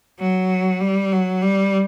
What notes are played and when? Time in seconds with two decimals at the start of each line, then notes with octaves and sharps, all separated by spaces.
0.20 F#3
0.80 G3
1.12 F#3
1.42 G3